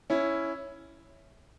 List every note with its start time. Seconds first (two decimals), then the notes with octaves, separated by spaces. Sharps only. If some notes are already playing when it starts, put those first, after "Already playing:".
0.10 C#4 E4